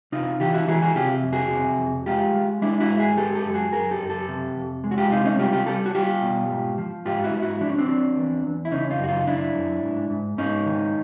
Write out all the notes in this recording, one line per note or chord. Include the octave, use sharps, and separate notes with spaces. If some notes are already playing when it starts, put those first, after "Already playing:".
C3 D#4 F4
E3 F4 G4
E4 F#4
E3 F#4 G#4
F#4 G#4
C3 F4 G4
F2
F#4 G#4
C3
F2
G#3 F4 G4
G#3
G#3 D4 E4
E4 F#4
G#2
F#4 G#4
G#3 G4 A4
G4 A4
F#2
F#4 G#4
F#2 G#4 A#4
G4 A4
F#2
G4 A4
C3
F2
G#3
F#4
F4 G4
C3 D#4 F4
C#4 D#4
G3 F4 G4
F4 G4
G3 G4 A4
F#4
G3 F4 G4
B2
G#2
F3
G#2 F4 G4
E4 F#4
G#2
E4 F#4
F3 D4
C#4
C4 D4
F3
E2
E2
E4
C#3 C#4 D#4
D#4 F4
F#2 F#4
D#4 F4
F#2 D4 E4
F#2
G#2
G#2
G#2 C#4 D#4
D#3